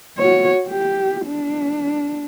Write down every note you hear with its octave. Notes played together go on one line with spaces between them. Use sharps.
F#4 C#5
G4
D4